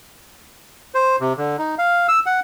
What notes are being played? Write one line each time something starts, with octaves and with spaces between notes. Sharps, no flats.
C5
C3
D3
D#4
F5
E6
F#5